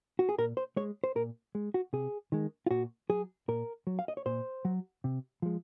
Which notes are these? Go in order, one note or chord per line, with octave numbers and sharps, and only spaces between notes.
F#4
G#4
A#2 A#4
C5
G#3 C#5
C5
A#2 A#4
G#3
F#4
C3 G#4
D#3 G#3
F4
A#2 F#4
F#3 G#4
A#2 A#4
F#3
F5
D#5
C#5
A#2 C5
F#3
C3
F3 G#3